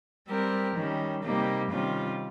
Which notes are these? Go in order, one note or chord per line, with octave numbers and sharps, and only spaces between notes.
G3 C4 G4 A#4
D#3 G3 C#4
C3 G3 A#3 D#4 G4
C3 D#3 G3 C#4 F4